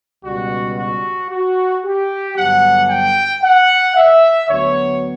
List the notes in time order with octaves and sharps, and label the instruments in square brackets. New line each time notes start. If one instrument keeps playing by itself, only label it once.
[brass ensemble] C#2 B2 G3 F#4
F#4
F#4
G4
G2 D3 F#3 B3 D4 F#5
G5
F#5
E5
D2 D3 F#3 B3 C#5